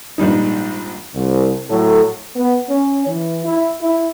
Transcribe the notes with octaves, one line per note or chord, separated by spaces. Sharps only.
A#1 G#2 G3 D#4
C2
A2 F#3 A4
B3
C#4
E3
E4
E4